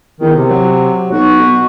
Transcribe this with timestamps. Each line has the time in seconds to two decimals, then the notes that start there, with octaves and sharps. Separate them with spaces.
0.20 E2 D#3
0.35 C3
0.49 F#3
1.11 B1 F#4
1.39 B2